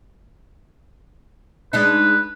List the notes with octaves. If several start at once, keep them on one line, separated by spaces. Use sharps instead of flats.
G#3 D4 D#4 B4